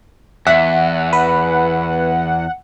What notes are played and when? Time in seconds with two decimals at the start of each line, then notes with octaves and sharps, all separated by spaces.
0.47 E2 E5 F#5
1.13 B4